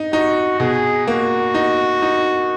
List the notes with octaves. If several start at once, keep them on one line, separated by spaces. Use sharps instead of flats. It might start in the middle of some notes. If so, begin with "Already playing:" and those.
Already playing: D#4
D#4 F#4
B2 G#4
A#3 F#4
D#4
D#4